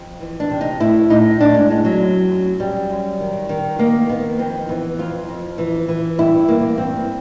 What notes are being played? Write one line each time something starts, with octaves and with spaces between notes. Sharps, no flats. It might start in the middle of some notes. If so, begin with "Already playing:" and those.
Already playing: F2
E3
D4
C3
D#4
A2 E4
A2 D#4
A2 D4
G#3
A2 G#3
F#3
F#2
F#2
F#2 G3
F#2
D#3
D#3
D#3 A#3
D#3 B3
F2 C4
E3 B3
F2 F4
F2
E3
E3
G2 E4
E3 A#3
G2 C4